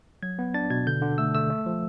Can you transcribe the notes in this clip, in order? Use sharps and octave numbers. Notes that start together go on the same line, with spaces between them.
F#3 G#6
B3
D4 A6
B2 G#6
D3 G6
D3
A3 E6
A3 E6
A3
F3